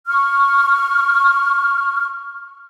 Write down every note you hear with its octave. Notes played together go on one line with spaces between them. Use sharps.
C#6 F6